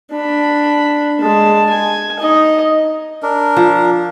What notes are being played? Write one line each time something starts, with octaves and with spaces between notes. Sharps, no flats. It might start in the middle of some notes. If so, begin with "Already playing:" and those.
D4 B5
G#3 A5
G#5
D#4 D#5
D4 A#4
F3